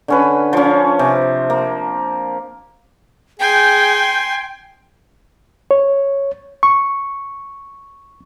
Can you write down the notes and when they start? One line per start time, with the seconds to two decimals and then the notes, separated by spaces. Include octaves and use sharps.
0.08 D3 C#4 B4
0.53 F3 C#4
0.99 C3
1.50 A#3
3.40 G#4 G5 G#5 C6
5.71 C#5
6.63 C#6